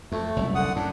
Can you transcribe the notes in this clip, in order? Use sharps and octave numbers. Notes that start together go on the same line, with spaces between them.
F2 A3
F#1 C2
D3 F#5 D#6
F#2 A2 D4